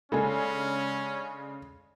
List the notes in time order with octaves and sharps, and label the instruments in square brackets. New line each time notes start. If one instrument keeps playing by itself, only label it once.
[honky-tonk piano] C#3 G#3 D4 [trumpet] C#4 [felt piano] A4 G#5